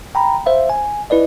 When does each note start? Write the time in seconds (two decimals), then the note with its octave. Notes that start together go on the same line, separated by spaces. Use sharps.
0.15 G5 A#5 B5
0.46 C5 E5 F5
0.70 G#5
1.10 E4 B4 D5 D#5